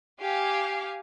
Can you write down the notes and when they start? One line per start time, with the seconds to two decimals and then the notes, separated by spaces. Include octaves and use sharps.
0.20 G4 F5 G#5